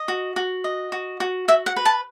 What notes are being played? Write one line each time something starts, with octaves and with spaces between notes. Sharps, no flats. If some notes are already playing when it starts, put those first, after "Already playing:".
Already playing: D#5
F#4
F#4
D#5
F#4
F#4
F#4 E5
F#5
B4
A5